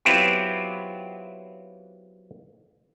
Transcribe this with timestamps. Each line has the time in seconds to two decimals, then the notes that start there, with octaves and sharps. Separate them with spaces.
0.05 F#3 B3 C4 E4 F4 G4